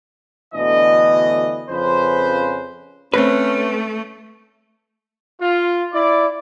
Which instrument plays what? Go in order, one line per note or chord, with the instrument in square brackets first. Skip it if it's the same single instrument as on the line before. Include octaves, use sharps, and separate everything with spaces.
[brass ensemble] D2 B2 D3 E3 D#5
F2 C#3 F3 C#4 B4 C5
[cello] A3 [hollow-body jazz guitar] C4 B4 [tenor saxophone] C#4
[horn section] F4
E4 D5